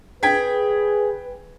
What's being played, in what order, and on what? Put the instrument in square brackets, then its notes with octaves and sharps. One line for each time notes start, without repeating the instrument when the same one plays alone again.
[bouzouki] G#4 [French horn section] B4 [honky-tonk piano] G5 G#6 B6